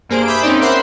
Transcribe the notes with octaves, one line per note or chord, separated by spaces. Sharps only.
G2 A#3 G#4 C5 D7
E5 B5 D6 D#6 G6
C4 C#4 D#4 D5
A#4 C5 E5 F#5 B5 C6